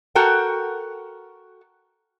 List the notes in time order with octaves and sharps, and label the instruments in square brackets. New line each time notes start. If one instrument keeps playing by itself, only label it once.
[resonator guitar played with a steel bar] F#4 A4 A#4 G5